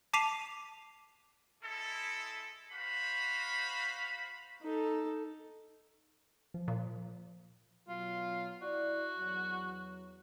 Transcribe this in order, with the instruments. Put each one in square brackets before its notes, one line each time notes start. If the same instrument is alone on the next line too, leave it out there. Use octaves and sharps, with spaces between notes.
[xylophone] A5 D6 B6 C7 D#7 F7
[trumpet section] G#3 E4 A4
F#4 C5 F5 B5
[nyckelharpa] D#4 A4
[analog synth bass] F3
[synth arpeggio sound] A#2
[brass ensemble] B2 F#3 [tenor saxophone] F4
[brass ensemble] E4 D5 [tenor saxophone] F#4
[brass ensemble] E2 F#3